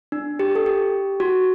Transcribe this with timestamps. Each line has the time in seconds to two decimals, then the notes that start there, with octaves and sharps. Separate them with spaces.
0.12 D4
0.39 G4
0.55 A4
0.66 G4
1.20 F#4